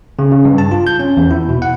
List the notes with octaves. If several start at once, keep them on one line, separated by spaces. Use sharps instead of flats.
C#3
C#3
G2
A5
F4
G6
C#4
E2
E4
B2
F#5